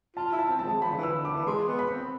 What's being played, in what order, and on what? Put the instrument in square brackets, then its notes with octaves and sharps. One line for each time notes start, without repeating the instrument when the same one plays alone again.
[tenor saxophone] F4 [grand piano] A5
[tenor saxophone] E4
[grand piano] A5
[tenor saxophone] C4
[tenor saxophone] F3 [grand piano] A5
[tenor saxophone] G#3
[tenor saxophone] F3 [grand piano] B5
[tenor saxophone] D3
E3
[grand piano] E6
[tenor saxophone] D3
[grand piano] D6
[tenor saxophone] E3
[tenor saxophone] G#3 [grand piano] C6
[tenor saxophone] B3
[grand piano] B5
[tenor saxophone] C4